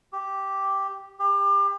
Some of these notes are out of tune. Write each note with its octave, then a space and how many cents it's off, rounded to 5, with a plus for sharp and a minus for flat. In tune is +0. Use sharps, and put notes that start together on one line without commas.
G4 -5
G4 +30